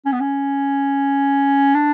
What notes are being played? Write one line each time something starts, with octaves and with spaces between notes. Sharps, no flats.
C#4
B3
C#4
D4